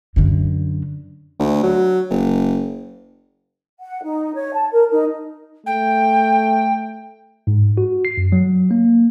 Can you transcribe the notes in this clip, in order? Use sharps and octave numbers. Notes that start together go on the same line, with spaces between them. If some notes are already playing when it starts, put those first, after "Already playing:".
F#2 D3
D2
F#3
F#1
F#5
D#4
C#5
A5
A#4
D#4
A3 G5
G#2
F#4
C7
F#2
F#3
A#3